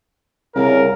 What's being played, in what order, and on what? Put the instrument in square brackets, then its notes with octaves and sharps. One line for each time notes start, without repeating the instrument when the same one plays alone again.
[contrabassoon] C2 [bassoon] C#3 [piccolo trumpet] A#4